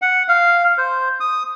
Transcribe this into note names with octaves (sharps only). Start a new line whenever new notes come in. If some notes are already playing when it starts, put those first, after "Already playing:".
F#5
F5
C5
D#6